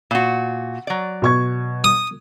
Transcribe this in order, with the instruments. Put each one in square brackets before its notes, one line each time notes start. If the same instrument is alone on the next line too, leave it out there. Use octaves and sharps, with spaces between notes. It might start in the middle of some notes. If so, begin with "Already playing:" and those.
[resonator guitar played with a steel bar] A#2 F#4
F#3 D5
[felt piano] B2 C#6 G#6
[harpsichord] D#6